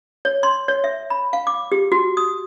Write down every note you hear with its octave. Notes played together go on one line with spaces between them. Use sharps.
C#5
C6
C#5
E5
B5
F5
D6
G4
F#4
D#6